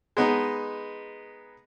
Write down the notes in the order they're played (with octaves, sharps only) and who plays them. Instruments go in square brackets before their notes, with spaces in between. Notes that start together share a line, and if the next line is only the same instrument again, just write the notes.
[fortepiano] G#3 B3 D#4